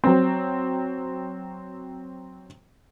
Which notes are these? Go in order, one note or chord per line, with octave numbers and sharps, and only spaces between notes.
F#3 C4